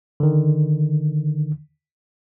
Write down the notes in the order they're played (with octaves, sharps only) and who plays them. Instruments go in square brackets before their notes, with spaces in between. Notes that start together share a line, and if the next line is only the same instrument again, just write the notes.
[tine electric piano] D3 D#3